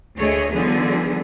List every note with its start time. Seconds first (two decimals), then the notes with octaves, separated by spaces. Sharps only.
0.17 D2 A3 G#4 C#5 D#5
0.52 D3 D#3 F3 G3 B3 G#4